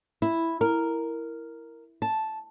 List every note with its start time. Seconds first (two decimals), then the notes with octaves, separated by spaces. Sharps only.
0.22 E4
0.61 A#4
2.02 A5